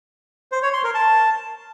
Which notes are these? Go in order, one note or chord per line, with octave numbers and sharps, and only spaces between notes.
C5
C#5
C6
A#4
A5